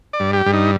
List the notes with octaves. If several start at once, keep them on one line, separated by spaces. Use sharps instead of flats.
D5
G2
G4
G2
D#4